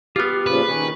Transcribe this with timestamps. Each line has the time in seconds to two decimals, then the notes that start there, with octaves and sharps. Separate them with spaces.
0.16 B3 F4 G4 F6
0.46 A#2 C#3 F3 B4
0.69 D#3 C#4